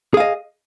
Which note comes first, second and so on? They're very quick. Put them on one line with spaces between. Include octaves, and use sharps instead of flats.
G#4 F5 D#5